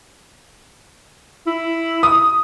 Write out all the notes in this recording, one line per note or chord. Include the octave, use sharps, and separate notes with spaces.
E4
D#6